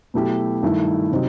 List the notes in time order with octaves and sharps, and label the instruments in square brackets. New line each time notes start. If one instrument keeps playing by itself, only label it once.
[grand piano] B2 F#3 A3 E4 G4
G2 D#3 A3 E4
C3 F#3 C4 D#4